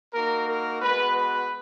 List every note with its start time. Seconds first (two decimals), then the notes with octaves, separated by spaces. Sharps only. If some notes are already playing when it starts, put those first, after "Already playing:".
0.14 A#3 D#4 F#4 A#4
0.48 A#4
0.81 G#3 B3 F#4 B4
1.16 B4